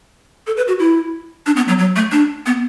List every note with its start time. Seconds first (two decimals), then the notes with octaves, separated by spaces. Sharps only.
0.47 A4
0.57 B4
0.68 F#4
0.79 E4
1.46 D4
1.57 B3
1.68 F#3
1.79 F#3
1.96 A3
2.12 D4
2.46 B3